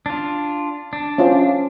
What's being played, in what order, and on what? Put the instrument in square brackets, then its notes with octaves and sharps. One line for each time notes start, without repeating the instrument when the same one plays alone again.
[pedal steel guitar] D4 F4
D4
[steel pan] C#4 F4 C5